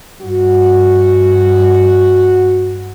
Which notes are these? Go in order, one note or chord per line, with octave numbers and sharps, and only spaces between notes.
G2 F#4